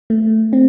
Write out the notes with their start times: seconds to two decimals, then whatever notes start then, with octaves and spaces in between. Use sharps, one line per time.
0.10 A3
0.53 C4